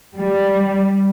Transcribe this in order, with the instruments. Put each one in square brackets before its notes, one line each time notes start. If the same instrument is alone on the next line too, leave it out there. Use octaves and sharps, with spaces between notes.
[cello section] G3